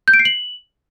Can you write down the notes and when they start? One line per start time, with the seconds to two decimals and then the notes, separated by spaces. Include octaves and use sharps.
0.08 G6
0.14 D7
0.19 C7
0.25 F#7